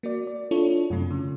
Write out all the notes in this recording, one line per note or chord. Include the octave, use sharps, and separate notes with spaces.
A#3 F#4 D5
D5
D4 E4 F4 A4 C#5
F#2 C3 A3
C#3